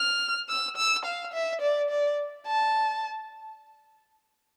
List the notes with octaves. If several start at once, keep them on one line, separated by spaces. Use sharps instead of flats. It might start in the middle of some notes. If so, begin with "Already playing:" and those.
Already playing: F6
E6
E6
F5
E5
D5
D5
A5